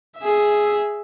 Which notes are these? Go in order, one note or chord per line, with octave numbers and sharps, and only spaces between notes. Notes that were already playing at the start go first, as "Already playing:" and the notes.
G#4 E5